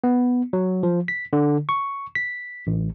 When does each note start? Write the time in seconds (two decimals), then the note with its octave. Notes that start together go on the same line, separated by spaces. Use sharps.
0.04 B3
0.53 F#3
0.83 F3
1.08 B6
1.33 D3
1.69 C#6
2.15 B6
2.67 A1